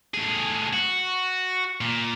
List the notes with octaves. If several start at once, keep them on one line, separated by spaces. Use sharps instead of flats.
A2 G#4
F#4
A#2